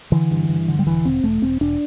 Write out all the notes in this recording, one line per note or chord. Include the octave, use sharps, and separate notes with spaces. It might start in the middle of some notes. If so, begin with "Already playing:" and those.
D3 E3
G2
G2
D3
G3
E1 E3
E1 C4
E1 A3
E1 C4
E1 D4